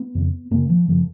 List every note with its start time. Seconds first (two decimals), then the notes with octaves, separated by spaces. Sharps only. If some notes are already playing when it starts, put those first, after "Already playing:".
Already playing: B3
0.15 F2 C#3
0.51 F#2 C#3 A#3
0.69 F3
0.88 F#2 C#3 F3